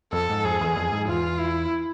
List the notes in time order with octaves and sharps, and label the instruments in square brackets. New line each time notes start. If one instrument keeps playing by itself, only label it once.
[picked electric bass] F2 [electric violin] A4
[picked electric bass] G#2
[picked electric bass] F2 [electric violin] G#4
[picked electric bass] E2
F2
G#2
[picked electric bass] E2 [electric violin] F4
[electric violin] E4